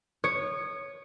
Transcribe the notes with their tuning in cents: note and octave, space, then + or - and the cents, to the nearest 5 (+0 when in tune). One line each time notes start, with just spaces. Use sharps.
C#5 +0 D#6 -25